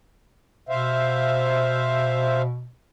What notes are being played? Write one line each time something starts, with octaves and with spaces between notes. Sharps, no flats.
B2 C5 E5 F5